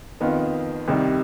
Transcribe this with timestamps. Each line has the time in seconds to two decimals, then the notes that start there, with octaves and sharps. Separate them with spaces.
0.20 F2 D#3 B3 F4
0.88 C2 C3 D#3 G3